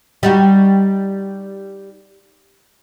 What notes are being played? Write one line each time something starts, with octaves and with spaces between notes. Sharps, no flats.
G3 D#4 F#4